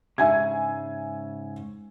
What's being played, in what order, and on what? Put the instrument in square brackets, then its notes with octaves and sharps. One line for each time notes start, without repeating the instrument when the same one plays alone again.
[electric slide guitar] G#2 C#3 [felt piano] E5 G#5 G#6